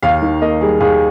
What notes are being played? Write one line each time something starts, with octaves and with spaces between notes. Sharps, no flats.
D#2 F5
D#3
A#3 D#5
G3 G#4
D#2 G#4